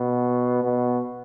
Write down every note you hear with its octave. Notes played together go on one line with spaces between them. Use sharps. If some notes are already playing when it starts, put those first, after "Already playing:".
Already playing: B2
B2